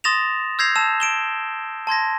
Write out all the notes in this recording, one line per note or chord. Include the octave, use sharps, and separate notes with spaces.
C6 D#6 A6 A#6 E7 F7
E6 G6 G#6 A#6 C7 F7
A5 E6 E7
D7 E7 G7
A5 C6 G#6 A#6